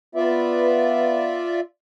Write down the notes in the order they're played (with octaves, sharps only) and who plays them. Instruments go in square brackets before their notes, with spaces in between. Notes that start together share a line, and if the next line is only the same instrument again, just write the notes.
[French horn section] B3 B4 [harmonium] F4 D5 E5